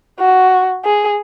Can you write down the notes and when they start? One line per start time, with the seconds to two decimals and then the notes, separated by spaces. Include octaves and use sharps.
0.20 F#4
0.85 G#4